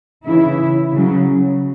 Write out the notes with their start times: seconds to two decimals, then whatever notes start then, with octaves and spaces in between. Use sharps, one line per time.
0.24 C#3 E3 E4
0.92 C#3 F#3